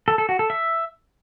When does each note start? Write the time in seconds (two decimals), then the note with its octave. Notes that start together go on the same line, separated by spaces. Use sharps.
0.08 A4
0.18 A4
0.29 F#4
0.39 A4
0.50 E5